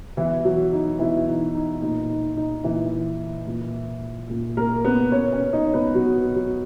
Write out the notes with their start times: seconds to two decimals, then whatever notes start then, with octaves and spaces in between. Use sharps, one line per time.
0.17 B2 E3 E4
0.44 F#3 F#4
0.72 D#4
0.99 B2 E3 E4
1.27 D#4
1.55 D#4
1.82 A#2 D#4
2.10 D#4
2.37 D#4
2.64 A#2 E3 E4
3.47 A#2
4.29 A#2
4.57 A#3 A#4
4.85 B3 B4
5.12 B2 C#4 C#5
5.32 C#4 C#5
5.53 D#4 D#5
5.74 B3 B4
5.95 B2 F#3 F#4
6.36 F#3 F#4